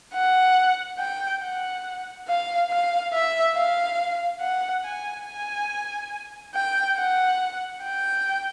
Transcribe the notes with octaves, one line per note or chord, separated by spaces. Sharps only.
F#5
G5
F#5
F5
F5
E5
F5
F#5
G#5
G#5
G5
F#5
G5